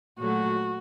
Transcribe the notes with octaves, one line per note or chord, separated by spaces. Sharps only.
A#2 F#3 A3 F#4